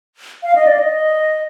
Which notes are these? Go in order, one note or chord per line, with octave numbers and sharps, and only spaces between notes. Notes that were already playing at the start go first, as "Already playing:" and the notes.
F5
D#5
D5
D#5